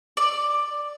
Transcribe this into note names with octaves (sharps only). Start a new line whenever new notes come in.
D5